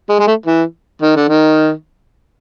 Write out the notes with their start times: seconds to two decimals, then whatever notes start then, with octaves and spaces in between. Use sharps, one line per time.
0.09 G#3
0.19 G#3
0.27 A3
0.46 E3
1.02 D#3
1.16 D3
1.29 D#3